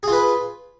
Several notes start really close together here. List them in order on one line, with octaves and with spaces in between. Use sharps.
G#4 F4 B4